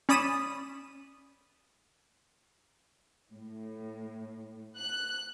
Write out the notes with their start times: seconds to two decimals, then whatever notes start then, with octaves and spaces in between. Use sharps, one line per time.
0.09 C#4 D5 B5 D#6 D#7 E7
3.30 A2
4.76 F#6